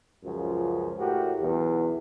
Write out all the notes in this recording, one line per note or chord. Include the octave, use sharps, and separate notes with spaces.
C#2 F#2 F3
A2 F#4 G4 A#4
B1 E2